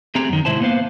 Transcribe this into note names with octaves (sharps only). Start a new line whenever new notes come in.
A3 C4 G4 G#4 A#5
F#2 D#3
G#2 C3 E4 C5 A5
A#3 B3 C5 F5